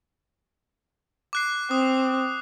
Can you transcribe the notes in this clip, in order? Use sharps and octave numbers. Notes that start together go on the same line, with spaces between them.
D6 F#6 C7
C4 D#6